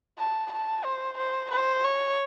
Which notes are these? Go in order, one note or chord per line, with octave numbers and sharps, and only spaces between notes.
A5
A5
C5
C5
C5
C#5